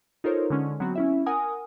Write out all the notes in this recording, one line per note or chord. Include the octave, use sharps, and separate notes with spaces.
D#4 F4 A4 A#4 C5 C#5
D3 G#3 C#4
F#3 B3 C4 F#4
C#4 E4 E5
A#4 F#5 G#5 D#6